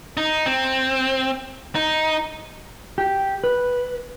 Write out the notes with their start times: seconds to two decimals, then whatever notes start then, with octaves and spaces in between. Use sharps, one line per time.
0.17 D#4
0.46 C4
1.75 D#4
2.98 G4
3.44 B4